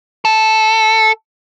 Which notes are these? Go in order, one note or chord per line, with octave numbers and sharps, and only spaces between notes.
A4